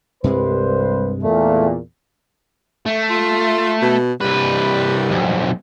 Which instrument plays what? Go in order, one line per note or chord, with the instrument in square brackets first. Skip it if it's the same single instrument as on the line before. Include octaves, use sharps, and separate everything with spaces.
[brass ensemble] C2 B4 C5 [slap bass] G2 C3 G#3
[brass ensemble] E2 A#2 [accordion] A3
[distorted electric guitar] A3
[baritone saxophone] F4
B2
[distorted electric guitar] C2 B4 [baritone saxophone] G3
[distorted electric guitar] B1 F2